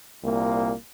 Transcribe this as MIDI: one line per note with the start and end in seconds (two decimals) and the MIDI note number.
0.23 0.73 36
0.23 0.73 46
0.23 0.73 58